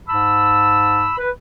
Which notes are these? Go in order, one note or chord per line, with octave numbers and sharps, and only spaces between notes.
G#2 A5 B5 E6
B4